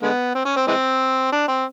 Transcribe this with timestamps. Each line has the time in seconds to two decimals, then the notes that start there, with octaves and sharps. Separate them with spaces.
0.02 D3 G#3 B3
0.35 C4
0.45 C#4
0.56 C4
0.67 E3 G#3 C4
1.33 D4
1.48 C4